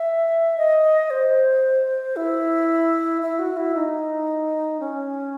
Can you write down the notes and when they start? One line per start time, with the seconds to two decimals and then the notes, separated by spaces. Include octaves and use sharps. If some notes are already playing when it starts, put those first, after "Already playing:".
Already playing: E5
0.58 D#5
1.10 C5
2.16 E4
3.22 E4
3.39 F#4
3.57 E4
3.75 D#4
4.80 C#4